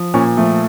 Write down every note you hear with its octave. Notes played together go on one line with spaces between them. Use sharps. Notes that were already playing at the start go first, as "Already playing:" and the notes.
Already playing: F3
A#2 C#4
F3 A3